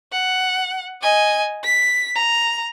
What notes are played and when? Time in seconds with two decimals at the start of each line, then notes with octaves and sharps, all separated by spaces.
0.12 F#5
1.02 D#5 G#5
1.64 B6
2.15 A#5